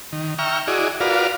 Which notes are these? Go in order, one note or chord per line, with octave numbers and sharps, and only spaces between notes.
D#3
E5 G5 A#5 C#6 F6
E4 F#4 G#4 D5 D#5
F4 F#4 A#4 B4 D5 F5